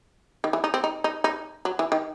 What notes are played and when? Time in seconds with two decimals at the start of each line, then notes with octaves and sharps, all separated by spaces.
0.44 D#3
0.53 E3
0.64 D#4
0.74 C4
0.84 D#4
1.04 D#4
1.24 D#4
1.65 F#3
1.79 E3
1.92 D#3